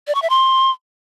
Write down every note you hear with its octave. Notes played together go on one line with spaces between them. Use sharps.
D5
C#6
E5
C6